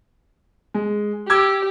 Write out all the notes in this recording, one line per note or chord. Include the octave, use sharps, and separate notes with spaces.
G#3
G4 D6 E6 G#6